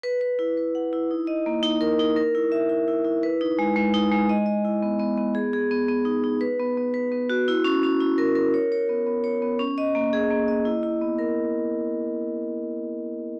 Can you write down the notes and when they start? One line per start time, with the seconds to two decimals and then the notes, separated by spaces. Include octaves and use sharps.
0.03 B4
0.21 B4
0.39 E4
0.57 B4
0.75 F#5
0.93 E4
1.11 D#4
1.27 D#5
1.46 A#3
1.63 D#4
1.81 A#4
1.99 D#4
2.16 A#4
2.35 E4
2.52 E5
2.69 E4
2.88 E4
3.05 E4
3.23 B4
3.41 D#4
3.59 G#3
3.76 G#3
3.94 D#4
4.12 G#3
4.29 D#5
4.46 D#5
4.65 E4
4.82 B3
5.00 B3
5.17 B3
5.35 G#4
5.53 G#4
5.71 B3
5.88 B3
6.05 D#4
6.24 D#4
6.41 B4
6.59 B3
6.77 B3
6.94 B4
7.12 B3
7.30 F#4
7.48 E4
7.64 C#4
7.83 C#4
8.00 E4
8.18 A#4
8.35 A#4
8.54 C#5
8.72 C#5
8.89 B3
9.07 B3
9.24 C#5
9.42 B3
9.59 C#4
9.78 D#5
9.95 A#3
10.13 G#4
10.30 A#3
10.48 D#5
10.65 E4
10.83 E4
11.01 B3
11.19 A#4